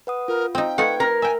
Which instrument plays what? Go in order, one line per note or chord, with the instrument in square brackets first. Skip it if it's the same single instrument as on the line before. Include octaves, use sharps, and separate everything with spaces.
[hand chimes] B4 F#5 D#6
[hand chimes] F4 [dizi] A#4
[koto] C4 D#4 [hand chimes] F5 [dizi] G5
[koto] A3 D#4 F4 [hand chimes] B4 G#6 [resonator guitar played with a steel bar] F#5
[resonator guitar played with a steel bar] A#4
[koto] E5 G5 [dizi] G#5